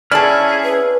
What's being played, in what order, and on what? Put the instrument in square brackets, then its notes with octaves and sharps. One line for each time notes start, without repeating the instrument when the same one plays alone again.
[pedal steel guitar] C#4 E4 F6 [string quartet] G#4 [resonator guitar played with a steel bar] D5 A5
[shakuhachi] B4